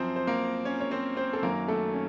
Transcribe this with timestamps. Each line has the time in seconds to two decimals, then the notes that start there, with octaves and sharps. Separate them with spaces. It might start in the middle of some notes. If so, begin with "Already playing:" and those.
Already playing: F#2 F3 C4 C5
0.16 C5
0.27 A#3 A#4
0.65 C#4 C#5
0.80 C#5
0.91 C4 C5
1.17 C4 C5
1.33 A4
1.42 F#2 D#3 F#3 A#3 A#4
1.68 A3 A4
1.94 C#4